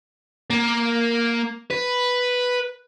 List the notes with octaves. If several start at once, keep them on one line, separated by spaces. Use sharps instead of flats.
A#3
B4